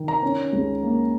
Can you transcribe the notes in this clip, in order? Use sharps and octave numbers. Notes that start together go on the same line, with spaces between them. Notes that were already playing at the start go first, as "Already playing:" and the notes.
Already playing: D#3
A#5
C#4
C#2
A#3